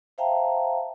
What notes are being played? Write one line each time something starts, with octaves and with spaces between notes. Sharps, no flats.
C5 E5 F5 G5 A5 A#5